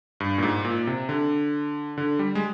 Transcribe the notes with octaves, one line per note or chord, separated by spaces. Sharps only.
G2
A#2
G#2
A#2
C3
D3
D3
G3
G#3